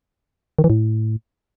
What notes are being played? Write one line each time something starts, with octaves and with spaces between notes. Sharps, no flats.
D#3
E3
A2